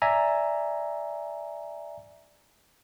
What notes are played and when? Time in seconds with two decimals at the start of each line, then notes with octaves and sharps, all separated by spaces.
0.02 D5 E5 G#5 A#5